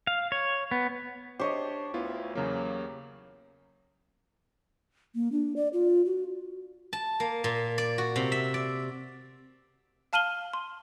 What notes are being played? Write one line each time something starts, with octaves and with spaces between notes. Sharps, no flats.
F5
C#5
B3
D4 G4 C5 C#5 D#5
D2 B3 E4 F4
E2 C#3 F#3 A#3
A#3
D4
D5
F4
F#4
A5
A#3
A#2
D5
F#4
C3
E5
D5
F5 A5 F6 D#7 F#7 G7
C6